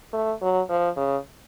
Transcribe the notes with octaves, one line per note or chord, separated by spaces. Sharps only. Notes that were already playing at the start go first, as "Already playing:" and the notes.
A3
F#3
F3
C#3